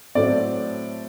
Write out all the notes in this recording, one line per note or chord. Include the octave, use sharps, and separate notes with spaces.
A2 F#3 A3 C4 D5